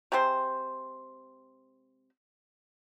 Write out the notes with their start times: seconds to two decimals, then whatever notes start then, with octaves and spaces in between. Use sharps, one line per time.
0.12 C3 G#3 C4 C5